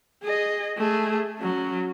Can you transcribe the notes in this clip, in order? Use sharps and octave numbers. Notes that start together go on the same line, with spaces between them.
G#4 D#5
A3 G#4
F#3 C#4